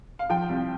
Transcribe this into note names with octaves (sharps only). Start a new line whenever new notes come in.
F5
F3 G5
C2